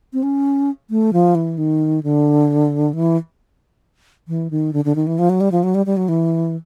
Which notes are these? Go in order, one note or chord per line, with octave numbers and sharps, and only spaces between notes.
C4
C#4
A3
F3
E3
D#3
D3
E3
E3
D#3
D3
D3
D#3
E3
F3
F#3
G3
F3
F#3
G3
G3
F#3
E3